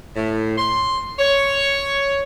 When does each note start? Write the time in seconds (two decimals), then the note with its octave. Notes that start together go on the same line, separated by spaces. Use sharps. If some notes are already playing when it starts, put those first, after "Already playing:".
0.16 A2
0.58 C6
1.19 C#5